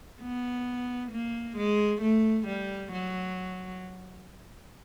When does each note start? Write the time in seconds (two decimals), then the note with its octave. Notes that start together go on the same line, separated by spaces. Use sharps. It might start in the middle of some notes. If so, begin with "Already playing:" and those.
0.21 B3
1.12 A#3
1.57 G#3
2.02 A3
2.47 G3
2.92 F#3